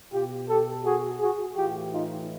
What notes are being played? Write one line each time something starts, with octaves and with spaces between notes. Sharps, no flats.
B2 F4 G4
G4 A4
F#4 G#4
F#4 G#4
A2 E3 F4 G4
D#4 F4